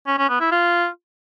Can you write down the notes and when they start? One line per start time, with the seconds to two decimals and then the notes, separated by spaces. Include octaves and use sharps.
0.07 C#4
0.18 C#4
0.29 B3
0.41 E4
0.52 F4